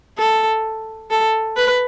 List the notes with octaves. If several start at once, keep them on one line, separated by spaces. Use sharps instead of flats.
A4
A4
B4